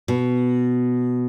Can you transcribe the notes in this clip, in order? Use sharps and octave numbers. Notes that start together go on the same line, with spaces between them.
B2